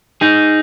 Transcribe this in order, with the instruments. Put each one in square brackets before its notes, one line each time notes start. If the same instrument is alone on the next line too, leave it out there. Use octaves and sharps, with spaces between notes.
[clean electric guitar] D#4 G#4